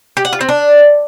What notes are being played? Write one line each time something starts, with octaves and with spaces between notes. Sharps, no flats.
G4
F#5
F4
C4
D4